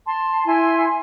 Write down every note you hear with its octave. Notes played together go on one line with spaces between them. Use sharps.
A5 C6
E4 G#5 C6